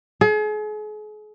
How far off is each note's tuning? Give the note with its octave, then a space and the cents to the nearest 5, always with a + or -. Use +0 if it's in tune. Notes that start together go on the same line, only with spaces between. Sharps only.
G#4 +40